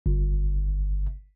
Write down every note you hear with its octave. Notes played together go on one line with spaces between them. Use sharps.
G1